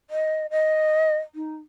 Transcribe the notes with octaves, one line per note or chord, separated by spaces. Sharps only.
D#5
D#5
D#4